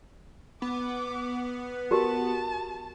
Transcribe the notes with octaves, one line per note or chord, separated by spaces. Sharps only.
B3 D6
F#4 G4 A#4 A5